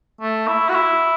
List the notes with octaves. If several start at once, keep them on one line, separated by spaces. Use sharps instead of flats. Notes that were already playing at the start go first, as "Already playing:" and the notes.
A3
E4
F#4
E4